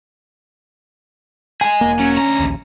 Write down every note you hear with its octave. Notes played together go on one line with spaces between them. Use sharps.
G#3 G#4 G#5
E1 A#3
F#3 C#4
D2 A#5
A#1 D#2